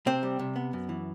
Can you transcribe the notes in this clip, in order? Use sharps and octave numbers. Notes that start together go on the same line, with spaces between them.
C3 C4
G3
C3
B3
F#2
E3